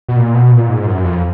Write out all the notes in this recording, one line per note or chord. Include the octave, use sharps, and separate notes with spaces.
B2
A#2
B2
A#2
G#2
F#2
F2